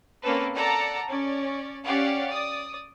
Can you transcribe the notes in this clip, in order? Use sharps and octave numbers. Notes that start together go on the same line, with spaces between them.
A#3 C4 C#4 A4 B4
A4 D5 F#5 A#5
C#4 D5
C#4 G4 D5 F5 F#5
D5 D#6